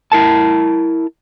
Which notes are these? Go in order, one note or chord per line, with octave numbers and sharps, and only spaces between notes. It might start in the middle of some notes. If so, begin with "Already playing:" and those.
E4 A#4 A5